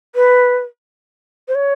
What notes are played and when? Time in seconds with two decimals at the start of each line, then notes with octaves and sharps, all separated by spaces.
0.15 B4
1.48 C5
1.55 C#5